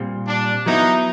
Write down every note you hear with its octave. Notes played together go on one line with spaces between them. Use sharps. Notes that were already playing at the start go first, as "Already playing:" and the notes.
Already playing: A#2 G3 C4
D4
F#3 B3 D#4 E4